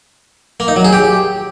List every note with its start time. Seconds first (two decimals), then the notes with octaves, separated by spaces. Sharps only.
0.60 A#3
0.68 D#4
0.76 F#3
0.84 G#4
0.93 G4